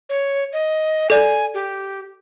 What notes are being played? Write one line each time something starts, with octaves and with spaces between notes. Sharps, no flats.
C#5
D#5
A4 D5 G#5
G4